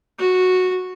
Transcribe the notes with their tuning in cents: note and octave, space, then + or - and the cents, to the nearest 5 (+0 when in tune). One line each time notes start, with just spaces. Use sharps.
F#4 -10